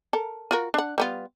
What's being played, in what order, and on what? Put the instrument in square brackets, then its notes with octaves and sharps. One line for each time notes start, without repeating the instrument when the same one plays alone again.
[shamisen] A4 A#4
F4 F#4 A#4
D4 F#5
G3 B3 F4